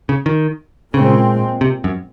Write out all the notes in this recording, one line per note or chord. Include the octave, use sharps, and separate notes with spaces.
C#3
D#3
A#2 C#3 G#3 C4
C3
F#2